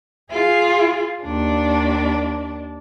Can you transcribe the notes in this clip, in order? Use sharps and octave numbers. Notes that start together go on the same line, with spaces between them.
F4 G#4
D#2 D4